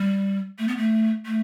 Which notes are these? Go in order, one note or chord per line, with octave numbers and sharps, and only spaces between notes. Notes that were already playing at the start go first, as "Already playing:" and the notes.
Already playing: G3
A3
B3
A3
A3